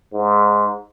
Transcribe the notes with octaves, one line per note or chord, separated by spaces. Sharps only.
G#2